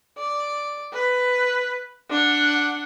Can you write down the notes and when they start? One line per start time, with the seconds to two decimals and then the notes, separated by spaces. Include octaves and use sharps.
0.18 D5
0.93 B4
2.10 D4 F#5